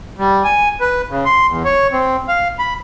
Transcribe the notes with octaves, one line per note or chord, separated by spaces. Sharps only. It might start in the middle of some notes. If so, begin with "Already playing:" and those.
G3
G#5
B4
C#3
C6
E2
C#5
C4
F5
B5